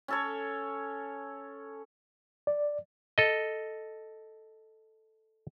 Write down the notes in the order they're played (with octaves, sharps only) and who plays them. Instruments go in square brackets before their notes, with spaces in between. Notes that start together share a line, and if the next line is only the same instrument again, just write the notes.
[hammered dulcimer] C#4 A4 C#5
[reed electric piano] D5
[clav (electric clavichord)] A4 D#5